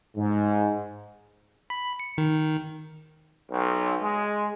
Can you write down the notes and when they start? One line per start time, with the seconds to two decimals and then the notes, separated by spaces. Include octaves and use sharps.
0.16 G#2
1.70 B5
2.00 C#7
2.18 D#3
3.50 B1
4.01 G#3